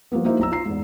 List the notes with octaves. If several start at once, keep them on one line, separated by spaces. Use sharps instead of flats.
F3 G3 A#3 B3
A#3 D#4 E4 F#4 C5 E5
B1 A#5 E6
F4 A#5 C7
E2 G#2